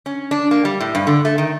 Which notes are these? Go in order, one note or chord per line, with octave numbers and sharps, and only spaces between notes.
C#4
D4
A#3
G3
A2
G2
D3
A3
D#3